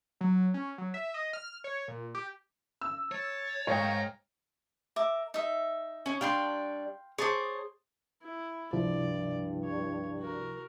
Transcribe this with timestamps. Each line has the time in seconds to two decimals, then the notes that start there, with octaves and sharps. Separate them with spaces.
0.21 F#3
0.54 C#4
0.78 F#3
0.94 E5
1.14 D#5
1.33 F6
1.64 C#5
1.88 A#2
2.15 G4
2.81 E6
3.12 C#5 A5
3.67 G#2 A#4 C#5 F5 G5
4.96 A#4 E5 D6
5.34 D#4 E5
6.06 C#4 C#5
6.21 G3 D4 F5 G5 C6
7.18 G#4 C5 C#5 A5 D6
8.22 E4
8.73 C#2 G2 C3 F3 E4 D5
9.64 C#5
10.19 F#4 A#4